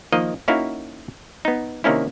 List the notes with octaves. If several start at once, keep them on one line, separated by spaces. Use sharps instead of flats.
D#3 F3 A#3 D#5
A#3 C#4 D#4 E4 F#4 F5
B3 D#4
C3 D#3 A#3 C#4 E4